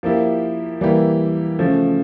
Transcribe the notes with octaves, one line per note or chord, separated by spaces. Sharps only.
F3 A#3 E4 G4
E3 G3 A#3 E4 G4
C#3 F3 A3